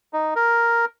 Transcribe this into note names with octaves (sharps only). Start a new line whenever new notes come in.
D#4
A#4